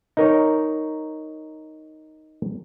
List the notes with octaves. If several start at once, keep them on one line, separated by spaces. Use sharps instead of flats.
D#4 A#4 C#5